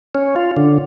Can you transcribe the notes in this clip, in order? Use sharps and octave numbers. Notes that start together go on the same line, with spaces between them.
C#4
F4
D3